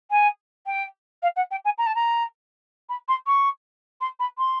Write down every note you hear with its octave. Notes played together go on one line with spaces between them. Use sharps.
G#5
G5
F5
F#5
G5
G#5
A#5
A5
A#5
B5
C6
C#6
C6
B5
C6